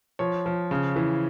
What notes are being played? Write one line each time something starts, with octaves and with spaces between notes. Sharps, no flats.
F3 C#5
F3
C#3
E3